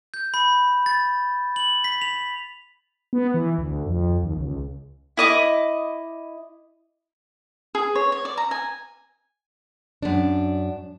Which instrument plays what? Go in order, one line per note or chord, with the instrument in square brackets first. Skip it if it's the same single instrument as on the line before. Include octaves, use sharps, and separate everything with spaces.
[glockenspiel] G6
B5
A6
F#7
B6
F7
[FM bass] B3
E3
D2
F2
D#2
C#2
[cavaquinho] E4 D#5 D6
G#4
C#5
C#5
D5
A#5
G#5
[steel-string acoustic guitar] F#2 D4